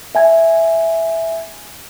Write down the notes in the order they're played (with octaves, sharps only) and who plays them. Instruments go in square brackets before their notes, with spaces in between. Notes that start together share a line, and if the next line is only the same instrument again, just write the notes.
[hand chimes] E5 G#5 G#6